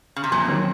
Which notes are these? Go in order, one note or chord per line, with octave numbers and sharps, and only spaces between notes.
C#3
C3
F2 A#2
D#3 F#3 C4